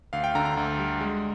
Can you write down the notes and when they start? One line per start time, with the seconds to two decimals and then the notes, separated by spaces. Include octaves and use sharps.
0.13 D2 F5
0.24 G5
0.35 D3 A#5
0.45 A#5
0.57 D2
0.79 G3
1.01 G#3